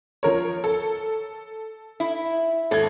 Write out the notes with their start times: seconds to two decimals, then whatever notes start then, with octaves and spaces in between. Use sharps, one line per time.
0.23 F3 A#4 C#5
0.64 A4
2.00 E4
2.71 G#1 A4 G#6